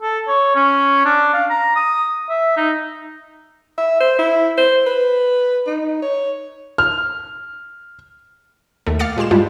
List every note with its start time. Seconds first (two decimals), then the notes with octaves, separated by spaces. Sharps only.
0.02 A4
0.28 C#5
0.55 C#4
1.05 D4
1.34 F5
1.50 A#5
1.76 D#6
2.29 E5
2.56 D#4
3.78 E5
4.01 C5
4.19 E4
4.58 C5
4.87 B4
5.67 D#4
6.02 C#5
6.78 F6
8.86 D#2 A3
8.99 F5 D6 F6 A6 C#7
9.17 A#2 G#3 G4 C6 E7
9.31 G2 G3 G#3 D4 E4 F4